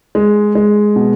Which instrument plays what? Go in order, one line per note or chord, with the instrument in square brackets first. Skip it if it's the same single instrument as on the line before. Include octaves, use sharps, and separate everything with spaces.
[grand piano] G#3
G#3
B2